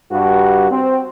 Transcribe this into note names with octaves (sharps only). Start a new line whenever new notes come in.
G2 F#4
C4